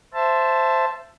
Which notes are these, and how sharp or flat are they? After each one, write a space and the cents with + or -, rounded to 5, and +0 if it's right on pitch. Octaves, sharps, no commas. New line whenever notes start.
C5 +0 E5 +20 A5 +0